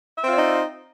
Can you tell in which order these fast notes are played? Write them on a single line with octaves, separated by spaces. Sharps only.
E5 C4 F4 D5 D#4